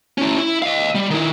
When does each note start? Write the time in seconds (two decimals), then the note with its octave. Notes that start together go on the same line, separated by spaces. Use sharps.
0.18 C#4 E4
0.38 E4
0.62 D#5 F5
0.95 G3
1.11 D#3 E4